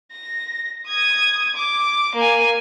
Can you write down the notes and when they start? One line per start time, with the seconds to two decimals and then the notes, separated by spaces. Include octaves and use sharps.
0.12 A#6
0.87 D#6 G#6
1.56 D6
2.15 A#3 G#5